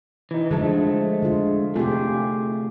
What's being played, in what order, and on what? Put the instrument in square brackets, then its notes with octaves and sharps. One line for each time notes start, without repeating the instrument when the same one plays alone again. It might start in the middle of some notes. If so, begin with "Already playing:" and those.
[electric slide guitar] E3 D#4
[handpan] D3 F3 [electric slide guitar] G#3 A3 A4
[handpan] D3 F4
[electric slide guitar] C3 A3 G#4 [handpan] F4 G4